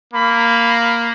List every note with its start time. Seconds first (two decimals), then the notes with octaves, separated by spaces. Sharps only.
0.13 A#3 B5